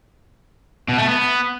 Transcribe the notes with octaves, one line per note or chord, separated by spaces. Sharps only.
B2
A3
B3